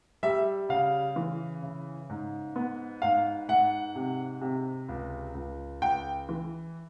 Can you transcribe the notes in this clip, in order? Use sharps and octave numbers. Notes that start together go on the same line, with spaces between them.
G3 E5
C#3 F5
E3
C#3
G#2
B3
G#2 F5
G#2 F#5
C3
C3
C#2
C#2
C#2 G5
E3